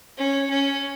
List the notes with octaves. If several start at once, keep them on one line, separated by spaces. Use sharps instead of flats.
C#4
C#4